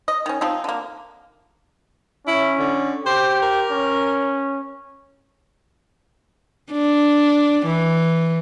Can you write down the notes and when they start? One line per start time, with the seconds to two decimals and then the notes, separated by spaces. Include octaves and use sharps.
0.08 D#5
0.26 D#3 C#4
0.41 F3 C4 D#4
0.64 D3 A#3
2.27 C#4 E4
2.59 D3
3.06 G4 C5
3.42 A#4
3.72 C#4
6.72 D4
7.66 E3